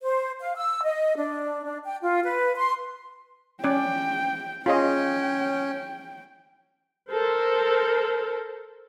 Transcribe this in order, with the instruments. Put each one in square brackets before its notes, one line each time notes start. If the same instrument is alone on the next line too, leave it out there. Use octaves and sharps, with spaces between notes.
[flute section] C5
F5
E6
D#5
D4
D4
G5
F4
B4
C6
[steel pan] C#4 D5 [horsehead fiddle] G5
[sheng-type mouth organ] C#4 [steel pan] F4 G#4 D#5 [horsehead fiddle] G5
[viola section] A4 A#4 C5